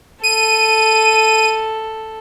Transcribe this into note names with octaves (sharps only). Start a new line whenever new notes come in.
A4 D#7